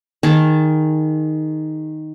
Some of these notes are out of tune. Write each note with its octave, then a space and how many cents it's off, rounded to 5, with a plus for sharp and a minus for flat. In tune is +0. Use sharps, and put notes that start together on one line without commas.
D#3 +0 G#4 +0 A5 +0